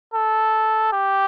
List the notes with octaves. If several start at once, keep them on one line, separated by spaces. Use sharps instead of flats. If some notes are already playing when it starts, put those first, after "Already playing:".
A4
G4